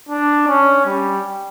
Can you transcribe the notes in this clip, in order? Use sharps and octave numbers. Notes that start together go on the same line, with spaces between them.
D4
C#4
G3